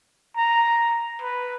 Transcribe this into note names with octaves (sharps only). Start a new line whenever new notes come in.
A#5
B4